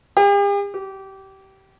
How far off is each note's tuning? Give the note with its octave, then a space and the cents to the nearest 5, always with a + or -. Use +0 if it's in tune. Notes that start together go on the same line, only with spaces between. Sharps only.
G4 +45
G4 -25